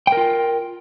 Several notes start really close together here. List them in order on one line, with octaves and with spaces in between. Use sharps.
G5 A#4 F4